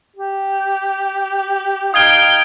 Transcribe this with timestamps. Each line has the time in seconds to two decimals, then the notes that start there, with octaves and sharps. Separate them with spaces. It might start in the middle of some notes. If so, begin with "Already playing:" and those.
0.16 G4
1.94 D#4 F5 G5 D#6 G#6 G7